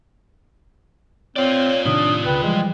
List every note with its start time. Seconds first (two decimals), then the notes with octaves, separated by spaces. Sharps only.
1.36 C4 F4 C#5 D5
1.85 A2 C3 D#3 D4 D#6
2.25 C#2 C#3 B4 G5
2.43 E3 F3 G3 G#3